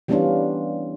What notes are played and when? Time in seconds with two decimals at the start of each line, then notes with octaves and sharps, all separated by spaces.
0.08 E3 G3 B3 C#4 D4 F4